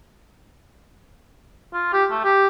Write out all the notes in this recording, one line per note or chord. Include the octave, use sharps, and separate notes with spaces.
F4
G4
A3
G4